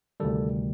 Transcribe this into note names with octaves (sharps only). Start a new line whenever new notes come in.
D2 C3 D#3 G3 A4